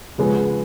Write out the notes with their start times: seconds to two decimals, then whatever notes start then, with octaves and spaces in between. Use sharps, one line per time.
0.18 C#3 F3 G#3 B3